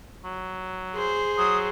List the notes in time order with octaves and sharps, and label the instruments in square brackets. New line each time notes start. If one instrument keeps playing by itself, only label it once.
[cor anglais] F#3
[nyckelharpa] G#4 C5
[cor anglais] F#3 [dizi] D#6